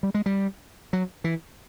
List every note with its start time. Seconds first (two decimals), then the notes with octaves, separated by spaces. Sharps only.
0.03 G3
0.14 G#3
0.26 G3
0.93 F#3
1.24 E3